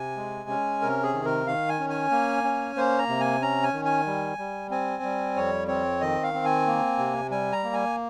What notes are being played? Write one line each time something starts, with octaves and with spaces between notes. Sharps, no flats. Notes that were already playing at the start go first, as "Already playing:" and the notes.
Already playing: C3 G#5
G#3
C#4
C3 A#4
G#4
D#3
A#4
D#3 F5
G#5
C#4
G#5
A#3
C#4
A#3 C5
A#5
C3
G#5
C#4 A#5
G#5
D#3
G#5
G3
G3
C4 G#5
G3
F2 C#5
C4 C#5
D#3 D#5
F5
C4
G#5
A#3
C3
G3 G#5
A#5
A#3
G#5